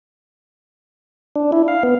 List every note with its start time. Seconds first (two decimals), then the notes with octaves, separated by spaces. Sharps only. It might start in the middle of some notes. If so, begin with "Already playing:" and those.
1.36 D4
1.52 E4
1.68 F5
1.83 B3